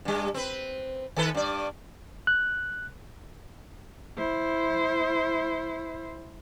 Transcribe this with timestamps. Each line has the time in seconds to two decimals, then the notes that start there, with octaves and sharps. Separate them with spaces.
0.05 G2 G3
0.34 C4 B4
1.16 D#3 A4 B4
1.35 G2 D5
2.27 F#6
4.17 E4 C5